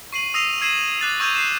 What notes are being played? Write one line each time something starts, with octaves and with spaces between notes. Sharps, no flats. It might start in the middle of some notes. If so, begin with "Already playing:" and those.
C#6 C7 D#7 F#7
D#6 E6 A#6 C7 D#7 F7
E6 G#6 C7 D#7 E7 F#7
D6 F#6 A6 C7
C#6 E6 G6 G#6 D#7 F7
C7 E7